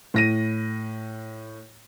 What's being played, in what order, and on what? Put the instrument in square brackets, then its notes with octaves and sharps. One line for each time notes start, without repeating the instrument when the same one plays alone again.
[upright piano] A2 A#6 D#7